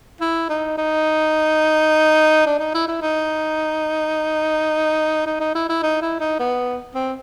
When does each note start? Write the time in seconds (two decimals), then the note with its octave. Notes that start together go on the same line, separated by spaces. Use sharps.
0.21 E4
0.50 D#4
0.78 D#4
2.46 D4
2.59 D#4
2.74 E4
2.88 E4
3.02 D#4
5.26 D#4
5.40 D#4
5.55 E4
5.69 E4
5.83 D#4
6.02 E4
6.20 D#4
6.40 B3
6.95 C4